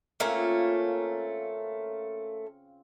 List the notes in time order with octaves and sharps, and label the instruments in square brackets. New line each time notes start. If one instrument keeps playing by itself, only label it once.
[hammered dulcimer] C#3 C4 F4 [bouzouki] A3 A#3 C#4